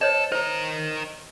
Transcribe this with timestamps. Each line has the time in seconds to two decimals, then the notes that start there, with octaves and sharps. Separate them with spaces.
0.01 A4 C5 C#5 D#5
0.32 D#4 A#4 C5